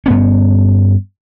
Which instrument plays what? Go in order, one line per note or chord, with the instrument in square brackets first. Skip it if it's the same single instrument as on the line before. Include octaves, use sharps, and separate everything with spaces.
[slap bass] G2 B3 C#4